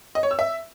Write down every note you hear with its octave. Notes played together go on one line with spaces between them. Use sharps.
D#5
C#5
E6
E5